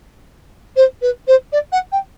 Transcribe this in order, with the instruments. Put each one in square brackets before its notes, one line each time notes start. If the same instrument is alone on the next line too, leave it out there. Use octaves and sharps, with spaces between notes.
[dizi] C5
B4
C5
D5
F#5
G5